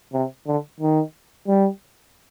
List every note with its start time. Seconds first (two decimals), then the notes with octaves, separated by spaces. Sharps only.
0.13 C3
0.47 D3
0.80 D#3
1.48 G3